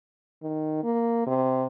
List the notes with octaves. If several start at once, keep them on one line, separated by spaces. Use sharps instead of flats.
D#3
A#3
C3